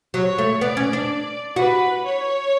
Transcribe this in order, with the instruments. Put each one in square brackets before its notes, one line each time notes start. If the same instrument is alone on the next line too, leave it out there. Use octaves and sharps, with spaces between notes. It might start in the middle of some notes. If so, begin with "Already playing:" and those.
[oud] F#3 [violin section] C#5
[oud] A3
[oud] B3 [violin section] D5
[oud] C#4
D4
[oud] F#4 [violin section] B4
[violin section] C#5